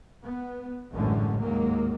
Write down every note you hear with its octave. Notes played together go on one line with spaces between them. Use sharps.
B3
A1 F#2 A2 D3 G#3 C#4
D#2 G#2 F#3 G#3 A#3